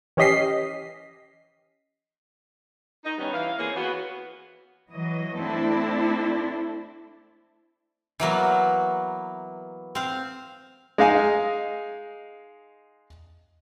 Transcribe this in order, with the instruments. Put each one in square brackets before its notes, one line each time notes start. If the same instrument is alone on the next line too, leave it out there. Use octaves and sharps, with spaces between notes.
[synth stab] E3 C#4 G4 D#5 B6 C7
[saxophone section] D#4
D#3 G3 B3 C#4
E3 F5
E3 A#3 C4 G#4 C5 C#5
E3 B3 F#4
[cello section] E3 F#3 D#5
A3 C4 D4 E4 A4
[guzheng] E3 F#3 A#3 B3
C4 F5
[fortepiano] G#3 D#4 F5 G#5